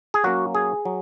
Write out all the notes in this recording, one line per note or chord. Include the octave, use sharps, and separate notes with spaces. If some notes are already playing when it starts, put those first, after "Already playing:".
G#4
F#3 A#3 C#4 F#4
G#4
F#3